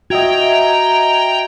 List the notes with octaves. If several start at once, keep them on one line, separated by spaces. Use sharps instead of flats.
F#4 D#5 E5 G5 A#5 G#6